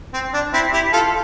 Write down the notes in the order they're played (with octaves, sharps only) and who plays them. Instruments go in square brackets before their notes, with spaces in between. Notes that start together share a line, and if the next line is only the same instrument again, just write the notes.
[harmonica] C4
D4
C4 E4
E4 G4
F4 A4